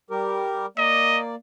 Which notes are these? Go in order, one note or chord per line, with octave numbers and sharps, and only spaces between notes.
G3 G4 A#4
A#3 D5 D#5